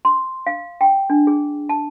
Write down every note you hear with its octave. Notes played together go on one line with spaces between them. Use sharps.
C6
F5
G5
D4
G#4
A5